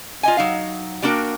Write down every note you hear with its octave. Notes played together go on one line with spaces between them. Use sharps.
F4 D#5 G#5
F#3 D#4 F5
G3 A#3 D4 F#4 A#4 G5